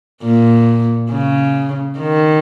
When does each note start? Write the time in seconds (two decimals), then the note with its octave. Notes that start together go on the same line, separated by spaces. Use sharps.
0.23 A#2
1.11 C#3
1.99 D#3